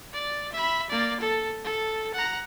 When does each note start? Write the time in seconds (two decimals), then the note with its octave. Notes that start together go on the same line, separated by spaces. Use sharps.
0.13 D5
0.53 E5 B5
0.90 A#3 D5
1.20 A4
1.64 A4
2.14 F#5 A#5